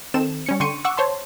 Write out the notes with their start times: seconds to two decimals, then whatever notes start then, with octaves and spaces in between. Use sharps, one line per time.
0.14 D#3 C4 A4 E7
0.46 G3 C#4 C#7
0.60 D3 G5 C6 C#6 C#7 D#7
0.85 F#5 C#6 D6 E6
0.97 C5 C#5 A5 C6